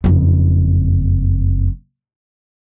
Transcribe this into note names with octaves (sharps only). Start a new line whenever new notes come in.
F#1 F2